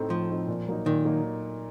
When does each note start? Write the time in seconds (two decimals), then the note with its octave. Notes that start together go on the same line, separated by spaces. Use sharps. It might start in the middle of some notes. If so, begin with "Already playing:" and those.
Already playing: A2 A3 C4 D#4
0.10 A2 F3
0.30 A3 C4 D#4
0.48 A#2
0.67 F#3 A#3 D#4
0.86 A#2 D#3
1.05 F#3 A#3 D#4